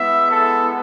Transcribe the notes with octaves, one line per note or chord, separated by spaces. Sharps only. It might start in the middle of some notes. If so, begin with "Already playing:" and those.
Already playing: G#3 B3 E4 E5
A4